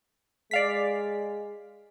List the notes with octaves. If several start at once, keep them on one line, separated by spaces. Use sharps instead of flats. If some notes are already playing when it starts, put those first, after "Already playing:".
G#3 D5 F5 B6